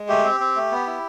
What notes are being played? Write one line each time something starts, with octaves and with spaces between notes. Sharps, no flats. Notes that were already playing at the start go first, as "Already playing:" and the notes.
Already playing: G#3
A3 G4
C4
C4
A3
B3
E4